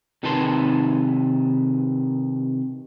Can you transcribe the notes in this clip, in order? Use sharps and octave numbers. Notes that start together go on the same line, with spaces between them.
C3 D#3 D#4 B4 A5 C6